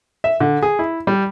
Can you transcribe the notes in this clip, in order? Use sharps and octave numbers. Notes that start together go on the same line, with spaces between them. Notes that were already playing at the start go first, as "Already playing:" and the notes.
E5
D3
G#4
E4
G3